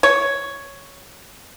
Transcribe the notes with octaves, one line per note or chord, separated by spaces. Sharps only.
C#5